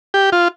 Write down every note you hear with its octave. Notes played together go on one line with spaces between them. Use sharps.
G4
F4